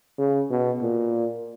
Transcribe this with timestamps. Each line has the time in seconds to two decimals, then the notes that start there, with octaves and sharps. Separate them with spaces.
0.19 C#3
0.50 B2
0.82 A#2